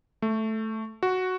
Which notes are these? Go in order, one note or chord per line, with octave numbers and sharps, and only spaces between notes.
A3
F#4